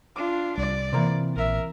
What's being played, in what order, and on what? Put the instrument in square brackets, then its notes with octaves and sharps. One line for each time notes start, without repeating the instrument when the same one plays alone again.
[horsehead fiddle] D4 F4 [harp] D6
[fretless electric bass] C2 G3 [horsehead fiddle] D5
[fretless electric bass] C3 [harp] E3 A#3 C4
[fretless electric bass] A#1 [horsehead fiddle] A#4 E5